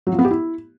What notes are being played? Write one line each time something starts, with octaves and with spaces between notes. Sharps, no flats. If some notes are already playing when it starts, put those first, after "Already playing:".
F#3
F3
B3
G4
E4